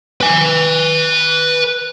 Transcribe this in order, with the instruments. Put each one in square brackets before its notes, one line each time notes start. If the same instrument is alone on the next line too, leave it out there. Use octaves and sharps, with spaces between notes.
[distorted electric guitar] B4 G#5